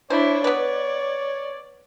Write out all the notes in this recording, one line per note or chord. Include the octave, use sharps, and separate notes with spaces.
D4 E4 C5 C#5
B3 B4 D5